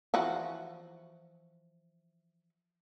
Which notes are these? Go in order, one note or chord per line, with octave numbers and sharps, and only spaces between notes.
E3 F3 F#4